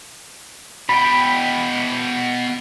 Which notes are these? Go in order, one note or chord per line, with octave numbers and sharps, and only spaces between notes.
B2 G5 B5